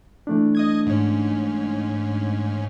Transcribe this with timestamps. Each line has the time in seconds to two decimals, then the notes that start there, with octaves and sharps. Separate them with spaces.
0.27 E3 A3 D4
0.55 D#5 D#6 G#6
0.87 G#2 C#4